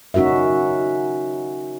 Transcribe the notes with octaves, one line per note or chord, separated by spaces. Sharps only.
C#4 D#4 F#4 A#4 E5